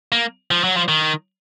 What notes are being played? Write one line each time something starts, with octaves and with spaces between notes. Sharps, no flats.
A#3
F3
F#3
F3
D#3